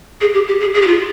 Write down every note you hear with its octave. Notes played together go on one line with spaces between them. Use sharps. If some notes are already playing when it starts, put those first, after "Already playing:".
G#4
G4
G4
G#4
G#4
G4
F4